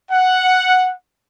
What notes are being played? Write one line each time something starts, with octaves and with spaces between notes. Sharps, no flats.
F#5